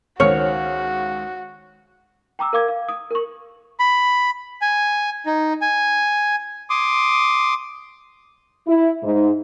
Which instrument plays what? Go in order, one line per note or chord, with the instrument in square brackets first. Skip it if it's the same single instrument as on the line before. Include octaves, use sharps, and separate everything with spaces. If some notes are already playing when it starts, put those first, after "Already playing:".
[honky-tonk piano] C#2 D#3 F6 [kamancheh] F#4 [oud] C#5
[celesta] G5 A#5 D6 E6
A#4 F5 D6 G#6
F5
D#6
A#4 C#6
[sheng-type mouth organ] B5
G#5
D#4
G#5
C6 D6 D#6
[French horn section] E4
G#2